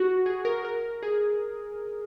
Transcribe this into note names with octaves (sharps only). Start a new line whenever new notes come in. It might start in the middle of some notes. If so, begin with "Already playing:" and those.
Already playing: F#4
G#4
A#4
A#4
G#4